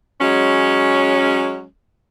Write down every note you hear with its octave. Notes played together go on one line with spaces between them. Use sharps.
F#3 G#3 C#4